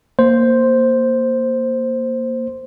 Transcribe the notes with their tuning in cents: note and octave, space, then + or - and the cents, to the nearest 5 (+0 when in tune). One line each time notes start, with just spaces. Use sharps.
A#3 +0 C5 +0